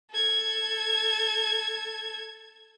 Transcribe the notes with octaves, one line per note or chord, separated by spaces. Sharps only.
A4 G#6